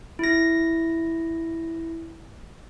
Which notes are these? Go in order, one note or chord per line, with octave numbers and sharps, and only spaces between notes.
E4 A#6